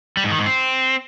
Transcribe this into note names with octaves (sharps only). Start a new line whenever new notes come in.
G3
G#2
D#3
G#2
C4